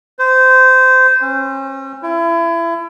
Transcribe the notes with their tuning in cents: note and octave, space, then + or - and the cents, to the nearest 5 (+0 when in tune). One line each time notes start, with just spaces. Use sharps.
C5 -20
C#4 -40
E4 +30